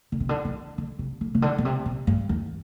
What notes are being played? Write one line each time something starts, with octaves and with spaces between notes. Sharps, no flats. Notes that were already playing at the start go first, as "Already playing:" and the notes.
D3
C3
D3
E3
D3
C3
D3
C3
D3
B2
C3
B2
G2
E2